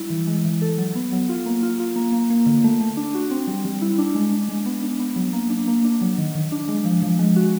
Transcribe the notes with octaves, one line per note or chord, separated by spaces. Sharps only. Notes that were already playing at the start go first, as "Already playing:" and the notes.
Already playing: G3 E4
E3
G#3
E3
A4
F#3
B3
F#3
F4
A#3
F4
F4
A#3
A#3
A#3
D3
A3
A3
D4
F#4
C4
G3
G3
E4
D4
G#3
D4
G#3
B3
D4
B3
F#3
A#3
D4
A#3
D4
F#3
D#3
D#3
D4
G#3
F3
F3
G#3
F#4